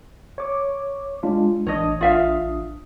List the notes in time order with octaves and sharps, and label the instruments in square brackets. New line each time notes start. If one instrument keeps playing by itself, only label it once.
[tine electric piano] C#5 D6
G#3 D4 F4
[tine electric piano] A1 D4 D#6 [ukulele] C#5 D#5
[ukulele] F4 E5 F5